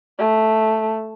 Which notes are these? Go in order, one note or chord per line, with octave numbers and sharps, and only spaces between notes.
A3